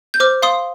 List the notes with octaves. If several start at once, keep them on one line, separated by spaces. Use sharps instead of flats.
G6
C5 D6 F6
F5 C6 D#6